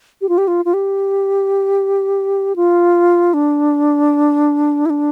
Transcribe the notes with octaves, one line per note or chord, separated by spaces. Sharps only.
G4
F4
G4
F4
F4
G4
F4
D4
E4
D4